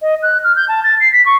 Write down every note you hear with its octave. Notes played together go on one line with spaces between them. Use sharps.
D#5
F#6
F6
G6
A5
A6
C7
B6
C#6